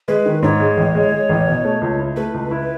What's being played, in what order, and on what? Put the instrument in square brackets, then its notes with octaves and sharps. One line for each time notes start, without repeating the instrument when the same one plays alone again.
[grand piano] G#3 [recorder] B4
[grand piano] D#3
[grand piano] G#2 [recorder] C#5
[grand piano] G#3
A1
G#3
G#3
A1
B2
A3
C#2
E4
[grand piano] A3 [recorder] B4
[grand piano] C#2
E4